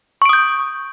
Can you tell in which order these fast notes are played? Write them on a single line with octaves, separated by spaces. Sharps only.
C#6 D7 D#6 G6